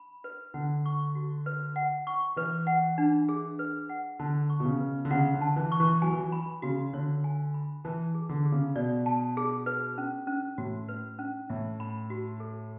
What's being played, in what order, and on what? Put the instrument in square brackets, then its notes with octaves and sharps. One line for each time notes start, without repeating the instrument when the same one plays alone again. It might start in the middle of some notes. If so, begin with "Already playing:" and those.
Already playing: [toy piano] B5
B4
[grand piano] D3 [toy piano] F#5
[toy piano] C#6
F#4
B4
F#5
C#6
[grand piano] E3 [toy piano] B4
[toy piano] F#5
D4
G#4
B4
F#5
[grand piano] D3 [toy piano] A5
[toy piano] C#6
[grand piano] B2
C#3
[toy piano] B4
[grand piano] D3
[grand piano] C#3 [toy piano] F#5
[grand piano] D3
[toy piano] A5
[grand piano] E3
[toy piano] C#6
[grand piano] E3
[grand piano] F#3 [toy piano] G#5
[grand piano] E3
F#3
[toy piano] B5
[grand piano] C#3 [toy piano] F#4
[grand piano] D3 [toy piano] C#5
[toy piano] G#5
B5
[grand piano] E3 [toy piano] A5
[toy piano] G#4
[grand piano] D3
[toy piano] G#4
[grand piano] C#3
[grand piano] B2 [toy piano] D5
[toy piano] A5
G#4
B4
C#4
C#4
[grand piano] A2 [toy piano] F#4
[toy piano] B4
C#4
[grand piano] A2 [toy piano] E5
[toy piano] B5
F#4
A4